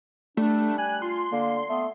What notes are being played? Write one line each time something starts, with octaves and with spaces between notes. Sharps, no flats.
G3 A3 D4
G#5 F#6
F4 C6
D3 A#3
A3 B3